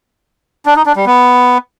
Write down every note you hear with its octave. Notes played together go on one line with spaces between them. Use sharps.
D4
D#4
D4
G3
B3